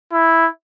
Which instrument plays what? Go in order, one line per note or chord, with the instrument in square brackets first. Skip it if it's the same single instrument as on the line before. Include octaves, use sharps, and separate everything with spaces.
[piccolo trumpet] E4